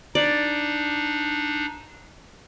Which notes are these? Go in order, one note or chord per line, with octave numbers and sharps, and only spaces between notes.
D4 D#4 D5